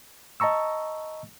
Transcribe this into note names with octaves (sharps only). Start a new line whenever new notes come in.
D#5 A5 A#5 C#6 E6